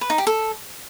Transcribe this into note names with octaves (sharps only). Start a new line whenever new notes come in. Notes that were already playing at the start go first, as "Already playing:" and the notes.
B4
D#4
G4
A4